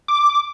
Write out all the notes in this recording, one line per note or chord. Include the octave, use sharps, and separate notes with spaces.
D6